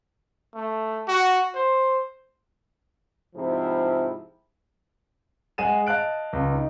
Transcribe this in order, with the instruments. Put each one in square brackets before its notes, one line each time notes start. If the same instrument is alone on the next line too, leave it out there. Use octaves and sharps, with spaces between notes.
[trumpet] A3
F#4
C5
[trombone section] G#2 C3 F3 E4
[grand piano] G#3 G#4 F#5 D#7 E7
D#5 F5 A5 F#6 D7
C#2
D#4